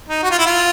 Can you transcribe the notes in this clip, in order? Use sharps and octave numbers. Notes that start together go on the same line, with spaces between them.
D#4
F#4
F4
E4
F4